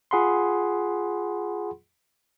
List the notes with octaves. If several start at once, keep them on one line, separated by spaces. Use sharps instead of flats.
F4 G#4 F#5 B5 C6